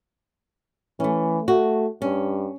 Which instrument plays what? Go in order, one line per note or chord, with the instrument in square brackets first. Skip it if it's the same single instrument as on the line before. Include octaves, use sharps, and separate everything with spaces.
[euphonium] E3 [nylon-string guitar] A3 C#4
[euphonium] A3 [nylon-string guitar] F#4
[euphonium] G2 [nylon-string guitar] C#4